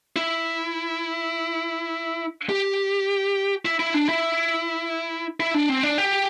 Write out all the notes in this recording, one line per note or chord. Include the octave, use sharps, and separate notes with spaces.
E4
G4
E4
E4
D4
E4
E4
D4
C4
D4
G4